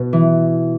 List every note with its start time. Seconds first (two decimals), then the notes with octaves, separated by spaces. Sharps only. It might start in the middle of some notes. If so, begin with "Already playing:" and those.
Already playing: B2
0.13 E3